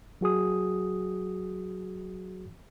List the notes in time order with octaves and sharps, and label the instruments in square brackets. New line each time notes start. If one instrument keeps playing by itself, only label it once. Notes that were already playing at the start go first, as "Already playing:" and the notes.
[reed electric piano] F#3 F#4 G#4 D#6